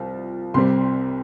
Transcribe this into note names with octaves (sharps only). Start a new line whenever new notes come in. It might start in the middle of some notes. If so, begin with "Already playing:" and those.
Already playing: C2 F3
C2 C3 G3 C4 C6